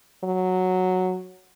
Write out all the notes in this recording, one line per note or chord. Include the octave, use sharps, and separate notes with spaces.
F#3